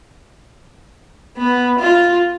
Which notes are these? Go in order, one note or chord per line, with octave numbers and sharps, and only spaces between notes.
B3
F4